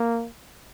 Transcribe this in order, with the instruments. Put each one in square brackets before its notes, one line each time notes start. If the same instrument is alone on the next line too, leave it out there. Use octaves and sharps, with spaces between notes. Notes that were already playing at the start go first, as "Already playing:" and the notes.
Already playing: [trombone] A#3